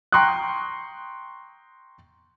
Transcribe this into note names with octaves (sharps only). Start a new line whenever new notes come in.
G5 A#5 C6 C#6 D#6 F#6